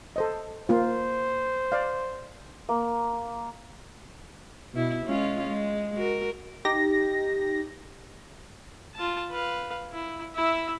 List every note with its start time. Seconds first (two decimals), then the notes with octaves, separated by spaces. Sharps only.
0.16 A4 C5 D#5
0.69 A#3 F4 C5
1.72 D5 F5
2.69 A#3
4.73 B2 E4
5.06 G#3 C#4 F4
5.48 G#3
5.95 F#4 A#4
6.65 D#4 G4 A#6
8.95 F4 A5
9.31 B4 F5
9.92 E4
10.35 E4 E5